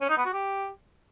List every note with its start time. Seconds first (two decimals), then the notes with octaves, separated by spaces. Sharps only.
0.01 C#4
0.09 D#4
0.17 B3
0.25 F#4
0.33 G4